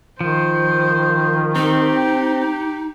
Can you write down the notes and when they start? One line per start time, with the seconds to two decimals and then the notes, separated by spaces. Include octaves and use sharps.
0.21 D#3 F3 C5
1.56 C4 D#4 G4